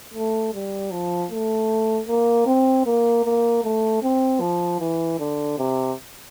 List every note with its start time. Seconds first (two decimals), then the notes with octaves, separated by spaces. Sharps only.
0.14 A3
0.53 G3
0.91 F3
1.31 A3
2.08 A#3
2.46 C4
2.86 A#3
3.25 A#3
3.64 A3
4.03 C4
4.41 F3
4.80 E3
5.19 D3
5.58 C3